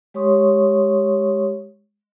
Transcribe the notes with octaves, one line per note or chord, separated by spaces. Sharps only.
G#3 G4 C#5 C6 C#6 D#6